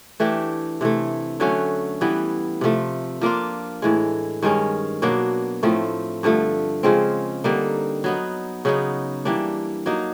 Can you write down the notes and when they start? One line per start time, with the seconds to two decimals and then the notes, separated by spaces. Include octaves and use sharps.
0.20 E3 A3 D4 G4
0.81 C3 E3 A3
1.40 D3 F#3 A3 C#4
2.01 E3 G3 B3
2.61 C3 F3 A3
3.21 F3 A#3 D4 F4
3.82 A2 E3 G#3
4.43 G2 D#3 G#3 C#4
5.02 B2 F#3 A#3 D4
5.63 A2 F3 A3 C4
6.23 G2 D3 F3 A3
6.83 C#3 F3 G#3 C4
7.44 D3 G3 A#3 D#4
8.04 F#3 B3 D#4
8.65 C#3 F#3 B3 D#4
9.25 E3 G3 A#3 D4
9.86 F#3 A#3 D#4